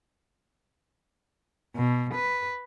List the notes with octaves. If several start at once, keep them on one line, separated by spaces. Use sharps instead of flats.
B2
B4